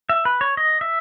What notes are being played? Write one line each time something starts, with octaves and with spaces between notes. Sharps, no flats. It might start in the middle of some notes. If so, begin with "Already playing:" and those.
E5
B4
C#5
D#5
E5